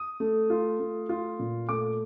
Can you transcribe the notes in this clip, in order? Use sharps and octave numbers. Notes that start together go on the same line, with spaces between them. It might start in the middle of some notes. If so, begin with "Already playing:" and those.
Already playing: D#6
A3
F4
A3
F4
A#2
A3 D6